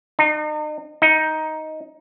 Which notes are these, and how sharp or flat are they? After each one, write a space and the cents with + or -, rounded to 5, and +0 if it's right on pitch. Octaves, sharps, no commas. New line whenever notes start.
D#4 -40
D#4 +10